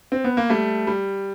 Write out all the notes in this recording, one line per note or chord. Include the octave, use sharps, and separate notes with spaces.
C4
B3
A#3
G3 A3
G3